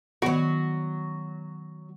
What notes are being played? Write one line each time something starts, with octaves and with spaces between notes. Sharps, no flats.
D#3 F#3 B3 F#4